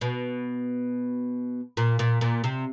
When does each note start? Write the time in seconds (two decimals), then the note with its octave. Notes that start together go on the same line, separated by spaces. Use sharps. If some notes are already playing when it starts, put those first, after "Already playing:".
0.01 B2
1.77 A#2
1.99 A#2
2.21 A#2
2.44 C3